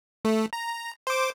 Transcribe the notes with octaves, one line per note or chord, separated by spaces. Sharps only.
A3
A#5
C5 D6